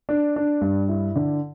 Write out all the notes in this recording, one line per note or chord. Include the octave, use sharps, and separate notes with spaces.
D4
D4
G2
E4
D3